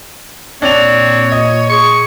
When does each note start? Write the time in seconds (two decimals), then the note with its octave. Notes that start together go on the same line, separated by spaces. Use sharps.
0.62 A#2 C4 D4 C#5 F7
1.32 D#5
1.70 G#4 C#6